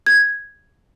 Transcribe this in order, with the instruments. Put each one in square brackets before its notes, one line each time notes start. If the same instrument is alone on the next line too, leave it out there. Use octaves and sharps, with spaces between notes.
[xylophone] G#6